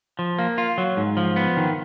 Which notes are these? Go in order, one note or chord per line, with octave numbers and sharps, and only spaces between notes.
F3
A#3
F4
F#3
G#2
F3
B3
D#3